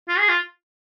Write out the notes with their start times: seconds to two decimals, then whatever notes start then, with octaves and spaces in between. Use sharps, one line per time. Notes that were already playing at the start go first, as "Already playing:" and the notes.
0.08 F4
0.19 G#4
0.29 F4